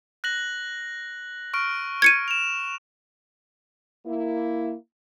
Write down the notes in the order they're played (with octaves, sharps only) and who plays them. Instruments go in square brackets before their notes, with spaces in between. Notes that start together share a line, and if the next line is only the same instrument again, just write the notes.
[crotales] F#6 A#6 F#7
C#6 F6 D7
[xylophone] G#6 C#7 D#7
[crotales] E7 F7
[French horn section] A#3 E4